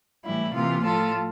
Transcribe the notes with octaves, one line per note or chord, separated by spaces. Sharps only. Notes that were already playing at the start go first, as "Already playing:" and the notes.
A2 E3 G3 E4
C3 E3 A#3 F4
A2 F3 A3 F4 A4